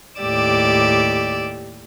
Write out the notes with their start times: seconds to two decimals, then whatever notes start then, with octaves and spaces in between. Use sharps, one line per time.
0.21 D#2 A2 G4 D5 D6 E6